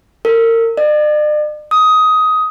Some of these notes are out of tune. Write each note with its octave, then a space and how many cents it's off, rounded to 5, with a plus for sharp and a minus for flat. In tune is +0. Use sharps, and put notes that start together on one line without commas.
A#4 -35
D5 +45
D#6 +15